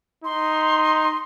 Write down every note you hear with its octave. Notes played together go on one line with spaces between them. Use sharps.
D#4 C6